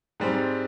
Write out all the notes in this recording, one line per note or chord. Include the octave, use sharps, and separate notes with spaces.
G#2 G3 C4